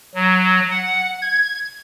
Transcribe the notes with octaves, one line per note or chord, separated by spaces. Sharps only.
F#3
F#5
G#6